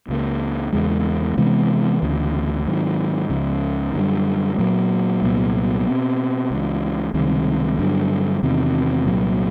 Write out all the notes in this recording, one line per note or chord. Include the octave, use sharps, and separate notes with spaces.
C#2 C#3 F3 A#3
E2 C#3 E3 G#3
C3 E3 G#3 B3
D2 C#3 E3
G#2 D#3 F#3
C#2 C#3 F3
F#2 D3 G3
A#2 F#3 A#3
C2 A#2 F#3 B3
B2 G#3 C4
C#2 C#3 E3
C#2 C3 D#3 G3
G2 D3 F#3
E2 C3 D#3
C2 A#2 F#3 A#3